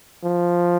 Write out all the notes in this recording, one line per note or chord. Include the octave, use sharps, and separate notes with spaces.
F3